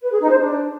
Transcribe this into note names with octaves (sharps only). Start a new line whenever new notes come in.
B4
G#4
D#4
C5
D4